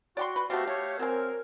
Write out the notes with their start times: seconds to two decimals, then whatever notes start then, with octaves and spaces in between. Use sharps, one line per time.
0.17 F#4 D5 G5 C6
0.36 B4
0.50 A3 B3 C4 F#4 G4 F5
0.67 A3 C#5
0.99 F#3 C4 A#4 G#5